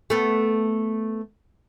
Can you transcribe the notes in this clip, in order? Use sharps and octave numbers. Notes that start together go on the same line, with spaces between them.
A3 B3